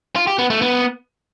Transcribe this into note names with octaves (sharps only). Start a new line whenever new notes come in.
F4
G4
B3
A3
B3